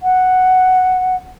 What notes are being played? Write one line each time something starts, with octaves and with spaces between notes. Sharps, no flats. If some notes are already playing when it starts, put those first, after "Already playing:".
F#5